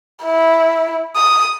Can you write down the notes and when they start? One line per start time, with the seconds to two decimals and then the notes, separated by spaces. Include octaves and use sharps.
0.25 E4
1.16 D#6